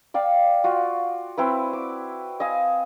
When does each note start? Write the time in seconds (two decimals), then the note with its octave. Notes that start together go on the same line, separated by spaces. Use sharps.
0.14 D5 F5 G5
0.64 F4 F#4
1.37 C4 E4 B4
1.73 D6
2.40 D#5 F5 G#5